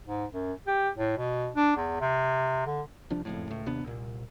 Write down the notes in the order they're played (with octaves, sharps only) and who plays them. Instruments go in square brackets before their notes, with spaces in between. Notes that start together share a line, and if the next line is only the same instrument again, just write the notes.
[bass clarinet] G#2
F#2
G4
A2
B2
D4
E2
C3
D3
[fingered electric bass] C2 F3 D4
F#1 F2 A2
C#2 A2
D#2 C3 B3 D4
C2 A#2